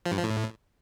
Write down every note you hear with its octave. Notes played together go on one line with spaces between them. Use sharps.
F3
G2
F3
A2